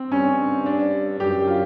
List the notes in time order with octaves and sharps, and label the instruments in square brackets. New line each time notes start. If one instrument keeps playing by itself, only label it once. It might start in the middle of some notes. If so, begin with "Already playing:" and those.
Already playing: [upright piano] C4
[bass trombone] G2 [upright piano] C#4
[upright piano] D4
[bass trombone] F#2 [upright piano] G4
[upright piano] F4